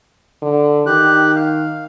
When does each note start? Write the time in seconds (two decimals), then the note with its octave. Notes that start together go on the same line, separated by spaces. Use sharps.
0.42 D3
0.86 D#3 G4 F#6
1.36 F5